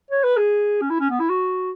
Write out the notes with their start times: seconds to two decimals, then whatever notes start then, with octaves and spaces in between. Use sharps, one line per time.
0.11 C#5
0.24 B4
0.37 G#4
0.81 C#4
0.90 E4
1.00 C#4
1.10 B3
1.20 E4
1.29 F#4